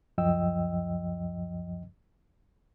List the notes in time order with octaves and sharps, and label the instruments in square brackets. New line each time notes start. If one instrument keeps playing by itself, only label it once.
[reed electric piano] C#2 F#2 F3 D#5 G5 E6